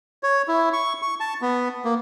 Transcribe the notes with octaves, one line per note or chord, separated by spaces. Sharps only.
C#5
E4
C#6
C#6
A5
B3
A#3